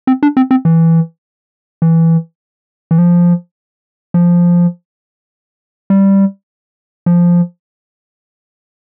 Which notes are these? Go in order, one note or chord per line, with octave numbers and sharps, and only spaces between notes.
C4
D4
C4
C4
E3
E3
E3
F3
F3
G3
F3